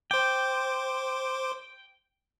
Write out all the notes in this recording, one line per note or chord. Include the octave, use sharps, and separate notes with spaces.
C5 G5 D6